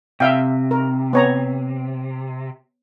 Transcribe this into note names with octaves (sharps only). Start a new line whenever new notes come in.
C3 E5 F5 G5
A#4
B3 C#5 A#5